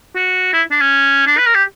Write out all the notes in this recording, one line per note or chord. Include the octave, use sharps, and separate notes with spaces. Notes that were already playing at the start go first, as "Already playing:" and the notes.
F#4
E4
D4
C#4
D4
B4
A#4
G4